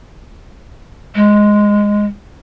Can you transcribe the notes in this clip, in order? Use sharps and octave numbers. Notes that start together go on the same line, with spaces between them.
G#3